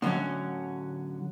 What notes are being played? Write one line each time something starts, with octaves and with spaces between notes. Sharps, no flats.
A2 D3 E3 F#3 C#4